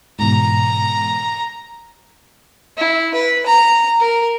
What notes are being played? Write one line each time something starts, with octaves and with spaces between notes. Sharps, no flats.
G#2 B2 E3 A#5
E4
B4
A#5
A#4